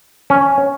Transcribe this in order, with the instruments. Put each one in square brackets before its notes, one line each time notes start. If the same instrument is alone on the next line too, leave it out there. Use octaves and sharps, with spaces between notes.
[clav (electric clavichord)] C#4